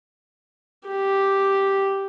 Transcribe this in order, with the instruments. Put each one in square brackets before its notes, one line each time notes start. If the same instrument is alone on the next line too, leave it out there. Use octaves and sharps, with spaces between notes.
[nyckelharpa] G4